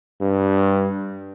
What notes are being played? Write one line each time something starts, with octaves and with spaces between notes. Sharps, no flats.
G2